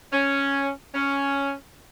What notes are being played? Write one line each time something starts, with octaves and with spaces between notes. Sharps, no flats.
C#4
C#4